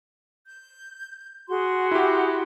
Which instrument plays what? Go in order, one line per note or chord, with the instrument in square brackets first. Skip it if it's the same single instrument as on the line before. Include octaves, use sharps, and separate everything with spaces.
[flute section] G6
F#4 G#4 C6
[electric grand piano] E4 G4